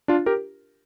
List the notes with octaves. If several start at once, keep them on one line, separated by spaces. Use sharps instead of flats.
D4 F4
G4 A#4